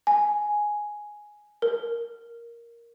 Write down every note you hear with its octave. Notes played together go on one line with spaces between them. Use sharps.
G#5
A#4